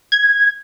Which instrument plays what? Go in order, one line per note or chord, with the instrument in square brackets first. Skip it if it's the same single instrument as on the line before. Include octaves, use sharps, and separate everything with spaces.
[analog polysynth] G#6